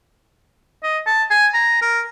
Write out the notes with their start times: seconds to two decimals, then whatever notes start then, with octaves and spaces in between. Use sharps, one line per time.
0.83 D#5
1.07 A5
1.30 G#5
1.54 A#5
1.82 A#4